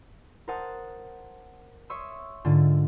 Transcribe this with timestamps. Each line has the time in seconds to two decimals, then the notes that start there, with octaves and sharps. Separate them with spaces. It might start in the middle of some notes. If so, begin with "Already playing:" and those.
0.48 A#4 C5 F#5 A5 D#6
1.90 C#5 E5 C6 C#6 D#6 E6
2.45 G#2 D3 D4 F4